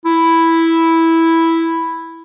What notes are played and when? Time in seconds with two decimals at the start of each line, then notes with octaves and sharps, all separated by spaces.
0.05 E4